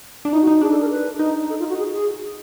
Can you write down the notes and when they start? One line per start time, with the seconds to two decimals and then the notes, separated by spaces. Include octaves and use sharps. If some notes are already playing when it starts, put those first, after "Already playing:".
0.25 D4
0.32 D#4 E4
0.42 F#4
0.47 D#4
0.61 D4 G#4
0.71 A4
0.81 A#4
0.90 B4
1.19 D#4
1.50 A4
1.59 F4
1.69 F#4
1.79 G#4
1.93 G#4